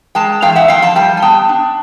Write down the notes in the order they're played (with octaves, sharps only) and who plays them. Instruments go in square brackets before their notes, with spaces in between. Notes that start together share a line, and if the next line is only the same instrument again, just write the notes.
[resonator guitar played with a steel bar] G#3 G5 A5
E2 F5 G5
E5 F#5
F3 F5 G5
G5 A5
G3 G5 A5
G#5
B3 G5 A5
D4